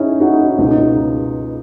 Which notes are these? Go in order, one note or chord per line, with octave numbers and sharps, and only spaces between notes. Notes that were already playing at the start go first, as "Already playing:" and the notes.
Already playing: D#3 C#4 D#4 E4
D#4 F#4
D#4
D#4
C#2 B2 D#4
D#4